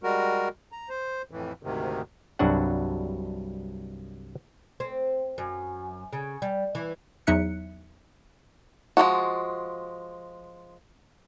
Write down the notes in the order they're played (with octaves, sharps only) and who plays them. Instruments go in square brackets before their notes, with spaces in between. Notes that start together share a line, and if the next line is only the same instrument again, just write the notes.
[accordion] G3 G#3 F#4 A#4
A#5
C5
F2 A2 E3
D2 G#2 C3 D#3
[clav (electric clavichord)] C2 G2 F#3 D4 F#4 F#5
[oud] C4
F#2
C#3
G3
E3
[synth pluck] E2 F#3 D#4 E5 F#6 C#7
[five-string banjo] F3 F#3 G#3 F#4